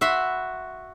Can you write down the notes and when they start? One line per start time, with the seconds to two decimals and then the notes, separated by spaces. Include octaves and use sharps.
0.01 F#4 E5 B5 C6